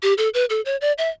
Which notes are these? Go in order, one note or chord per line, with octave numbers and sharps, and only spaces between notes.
G4
A4
B4
A4
C#5
D5
E5